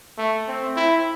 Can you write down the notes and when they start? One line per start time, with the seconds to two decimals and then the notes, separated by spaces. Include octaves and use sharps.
0.18 A3
0.48 C4
0.76 E4